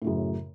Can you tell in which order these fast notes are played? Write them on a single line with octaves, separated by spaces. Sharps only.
A2 C#3 F#2